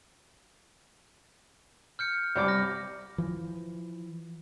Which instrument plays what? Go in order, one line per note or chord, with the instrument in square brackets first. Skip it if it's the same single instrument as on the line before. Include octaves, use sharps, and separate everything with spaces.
[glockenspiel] F6 G6 C#7
[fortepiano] C2 G3 D6
[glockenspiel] F6 A#6
[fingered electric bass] E3 F3